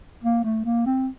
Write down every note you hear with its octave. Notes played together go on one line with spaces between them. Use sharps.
A#3
A3
A#3
C4